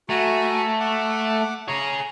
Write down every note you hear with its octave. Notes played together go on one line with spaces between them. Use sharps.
A3 F#4 G#5 A#5
F#5 D6
G#4 C#5 A#5